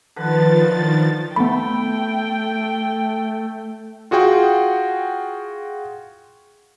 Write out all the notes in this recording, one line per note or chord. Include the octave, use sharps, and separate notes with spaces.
D3 D#3 F3 B4 B5 A6
A3 B3 G5 B5
F4 F#4 G#4 F#5 G5